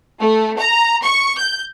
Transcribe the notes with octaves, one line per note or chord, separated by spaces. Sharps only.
A3
A#5
C#6
G6